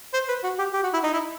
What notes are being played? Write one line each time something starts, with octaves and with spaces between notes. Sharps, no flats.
C5
B4
F#4
G4
G4
F#4
E4
D#4
E4